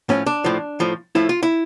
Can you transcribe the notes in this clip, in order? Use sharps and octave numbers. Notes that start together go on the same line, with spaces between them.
A2 F3 C#4
D4
A2 F3
A2 F3
A2 F3 E4
F4
E4